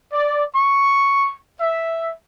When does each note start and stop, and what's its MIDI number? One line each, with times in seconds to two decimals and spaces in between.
0.13 0.44 74
0.56 1.34 85
1.61 2.12 76